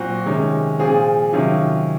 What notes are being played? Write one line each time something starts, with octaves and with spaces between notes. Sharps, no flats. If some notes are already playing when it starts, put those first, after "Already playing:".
Already playing: A#2 F#3 C4 F#4
C3 D#3 G#3 C#4
A#2 F3 C4 F4 G#4
C3 D#3 F#3 C#4 F4